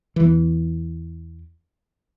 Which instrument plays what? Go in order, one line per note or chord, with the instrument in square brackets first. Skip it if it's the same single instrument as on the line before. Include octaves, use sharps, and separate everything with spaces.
[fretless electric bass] E2 E3